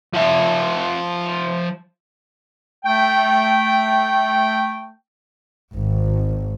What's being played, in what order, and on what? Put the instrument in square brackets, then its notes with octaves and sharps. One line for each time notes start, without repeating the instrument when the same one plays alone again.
[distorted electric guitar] F3 E5
[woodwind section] A3 G5
[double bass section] G#1